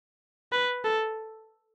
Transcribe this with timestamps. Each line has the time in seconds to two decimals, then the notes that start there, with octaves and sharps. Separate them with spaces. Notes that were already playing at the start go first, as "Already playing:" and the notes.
0.52 B4
0.85 A4